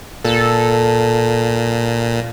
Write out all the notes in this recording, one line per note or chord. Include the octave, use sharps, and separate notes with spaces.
A#2 A4